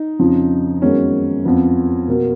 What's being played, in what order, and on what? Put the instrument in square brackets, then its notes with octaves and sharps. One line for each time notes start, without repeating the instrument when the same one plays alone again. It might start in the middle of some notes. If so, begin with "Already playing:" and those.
Already playing: [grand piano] D#4
F2 C#3 F3
F#2 D#3 G#3 B3 C#4
F2 F3 B3
B2 A#3